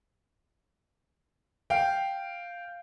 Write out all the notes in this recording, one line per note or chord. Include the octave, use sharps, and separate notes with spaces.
F5 G5